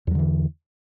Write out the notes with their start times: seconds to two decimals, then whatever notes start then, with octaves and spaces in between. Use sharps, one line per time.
0.07 E2
0.11 F#3
0.15 D3
0.19 E3